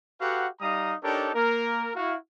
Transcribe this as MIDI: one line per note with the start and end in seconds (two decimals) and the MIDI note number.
0.21 0.47 66
0.21 0.47 67
0.21 0.47 69
0.21 0.47 71
0.21 0.47 77
0.21 0.47 78
0.61 0.95 55
0.61 0.95 63
0.61 0.95 77
0.61 0.95 82
0.61 0.95 87
1.03 1.29 62
1.03 1.29 63
1.03 1.29 67
1.03 1.29 69
1.03 1.29 70
1.03 1.29 73
1.35 1.91 58
1.35 1.91 70
1.96 2.16 64
1.96 2.16 66
1.96 2.16 77